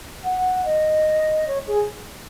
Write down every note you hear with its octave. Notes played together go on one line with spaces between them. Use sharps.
F#5
D#5
C#5
G#4